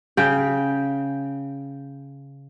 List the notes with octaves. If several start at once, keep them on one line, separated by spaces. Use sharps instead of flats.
C#3 G5